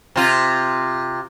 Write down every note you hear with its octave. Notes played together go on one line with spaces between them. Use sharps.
C3 F4